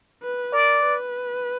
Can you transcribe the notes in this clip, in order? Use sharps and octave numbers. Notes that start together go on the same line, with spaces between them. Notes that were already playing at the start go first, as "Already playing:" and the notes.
B4
A#4 D5
B4